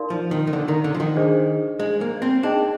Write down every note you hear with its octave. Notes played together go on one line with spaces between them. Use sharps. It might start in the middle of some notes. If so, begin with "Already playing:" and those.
Already playing: D#4 A#4 D5 F5 C6
F3
D#3
D#3
D3
D#3
D3
F3
D#3
D4 G#4 C5 D#5
G#3
A#3
C4
D4 D#4 G#4 D#5 G5